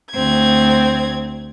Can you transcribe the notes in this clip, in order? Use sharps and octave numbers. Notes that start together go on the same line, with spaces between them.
D2 C4 G#6